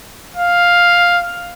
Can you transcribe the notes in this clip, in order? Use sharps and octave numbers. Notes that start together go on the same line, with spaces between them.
F5